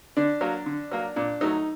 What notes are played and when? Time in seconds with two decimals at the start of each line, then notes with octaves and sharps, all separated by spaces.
0.17 D3 D4
0.41 F#3 A#3
0.66 D3
0.92 F#3 A#3
1.16 A#2 D4
1.41 F#3 A3 D#4